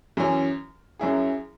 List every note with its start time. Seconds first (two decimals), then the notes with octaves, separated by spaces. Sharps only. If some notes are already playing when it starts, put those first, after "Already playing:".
0.17 F#2 E3 C#4
0.99 F#2 F#3 C#4 E4 G#4